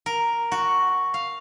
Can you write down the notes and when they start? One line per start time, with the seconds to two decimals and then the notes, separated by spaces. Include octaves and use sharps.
0.06 A#4
0.52 F#4
1.14 F5